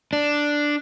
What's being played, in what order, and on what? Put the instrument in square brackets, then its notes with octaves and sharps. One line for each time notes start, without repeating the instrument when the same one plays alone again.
[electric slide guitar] D4